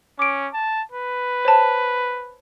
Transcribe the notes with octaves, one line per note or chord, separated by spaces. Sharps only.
C#4 D6 D7
A5
B4
C5 C#5 A5